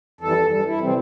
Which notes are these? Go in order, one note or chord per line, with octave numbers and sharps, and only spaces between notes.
F2 E3 G3 A4
G2 E3 G3 A4
E4
C3 E3 G3 C4